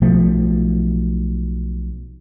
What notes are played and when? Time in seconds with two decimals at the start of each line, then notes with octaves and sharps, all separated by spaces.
0.01 B1 B2 F3 A3